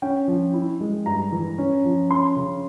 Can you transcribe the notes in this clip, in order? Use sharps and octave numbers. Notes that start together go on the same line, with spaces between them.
C#4 G5
F3
E4
G#3
G2 A#5
E3
C#4
F3
C#4 C6
C#3